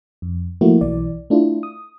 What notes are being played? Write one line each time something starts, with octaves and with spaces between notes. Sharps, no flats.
F2
F3 A3 A#3 E4 F#4
B1 E3 D5
A3 D4 E4 F4
D#6